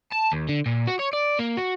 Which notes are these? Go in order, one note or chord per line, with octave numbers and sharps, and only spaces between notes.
A5
D#2
D3
A#2
F#4
C#5
D5
A#3
F#4